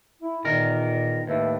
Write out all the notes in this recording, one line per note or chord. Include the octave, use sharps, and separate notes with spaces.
E4
E2 A#2 D#3 A#4
D#2 A2 B4 E5